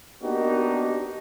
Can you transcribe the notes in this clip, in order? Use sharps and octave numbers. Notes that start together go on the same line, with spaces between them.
A#3 B3 D4 D#4 F#4 G4